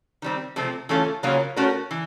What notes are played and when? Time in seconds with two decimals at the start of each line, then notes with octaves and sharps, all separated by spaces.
0.22 D#3 G3 C4
0.56 C3 F3 A3 C4
0.89 E3 A3 C#4 F4 A4
1.23 C#3 F#3 A#3 C#4 F4
1.56 A3 C#4 F#4 A#4
1.91 E3